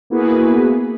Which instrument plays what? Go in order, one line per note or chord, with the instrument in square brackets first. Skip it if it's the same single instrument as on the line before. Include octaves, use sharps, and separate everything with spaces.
[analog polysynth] A#3 B3 E4 F#4 G#4 B4